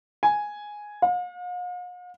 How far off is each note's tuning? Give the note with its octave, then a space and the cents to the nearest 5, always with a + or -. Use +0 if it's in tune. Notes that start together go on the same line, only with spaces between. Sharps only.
G#5 +0
F5 +45